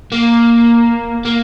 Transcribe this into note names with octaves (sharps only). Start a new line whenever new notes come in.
A#3
A#3